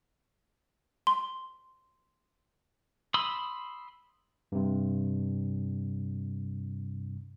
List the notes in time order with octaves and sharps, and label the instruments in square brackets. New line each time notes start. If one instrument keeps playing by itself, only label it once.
[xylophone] C6
[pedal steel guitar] B5 C6 D#6 E6
[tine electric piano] G2 C3